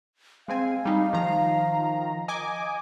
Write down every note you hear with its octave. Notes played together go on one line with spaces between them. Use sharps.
G#3 C4 F5 G#5
G3 D#4
D#3 F3 A#5
D#5 G#5 D6